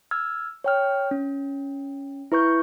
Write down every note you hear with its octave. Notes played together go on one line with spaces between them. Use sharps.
E6 F6 G#6
C#5 G5 F6
C#4
E4 B4 C#6 G6